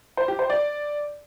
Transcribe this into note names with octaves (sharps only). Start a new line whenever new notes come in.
C5
G4
C5
D5